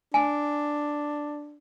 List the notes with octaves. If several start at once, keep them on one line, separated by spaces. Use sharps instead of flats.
D4 G#5